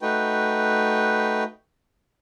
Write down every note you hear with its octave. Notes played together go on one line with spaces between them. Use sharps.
A3 D#4 F#4 B4 G5